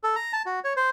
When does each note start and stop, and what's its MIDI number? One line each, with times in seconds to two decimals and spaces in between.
0.04 0.16 69
0.16 0.32 82
0.33 0.42 81
0.46 0.60 66
0.64 0.73 73
0.77 0.90 72